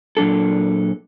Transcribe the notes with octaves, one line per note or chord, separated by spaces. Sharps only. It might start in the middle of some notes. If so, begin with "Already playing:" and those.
A#2 F#3 D4 A4